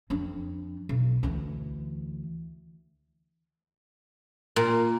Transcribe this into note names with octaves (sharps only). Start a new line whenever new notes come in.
F2 D4
B1
D2 E3
A#2